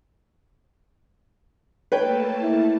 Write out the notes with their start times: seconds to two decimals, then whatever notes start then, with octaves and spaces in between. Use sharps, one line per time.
1.92 A3 A#3 B4 C#5 G5 A5
2.42 E4